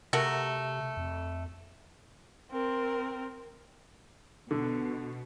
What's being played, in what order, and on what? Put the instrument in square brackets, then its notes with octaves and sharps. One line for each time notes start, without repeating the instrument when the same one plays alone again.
[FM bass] C3 [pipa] A3 F#4 A#4
[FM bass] F2
[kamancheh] C4 A#4
[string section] B2 [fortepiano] D3